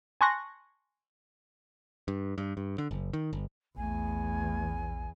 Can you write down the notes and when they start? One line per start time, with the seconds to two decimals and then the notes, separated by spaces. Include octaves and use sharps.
0.21 G#5 A5 C6 C#6 F#6 A#6
2.08 G2
2.38 G2
2.57 G2
2.78 D3
2.91 F#1
3.13 D#3
3.33 G1
3.77 A#1 E2 A3 G#5